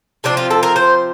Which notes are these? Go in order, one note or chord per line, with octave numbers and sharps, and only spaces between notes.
C3 F3 C4 D4
F4
A4
A#4
C5